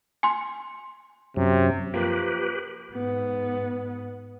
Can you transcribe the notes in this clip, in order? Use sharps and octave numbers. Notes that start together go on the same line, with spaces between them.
G#5 C6
F#2 C3 F#3 C#4
F3 A#3 G4 B4
G#2 B3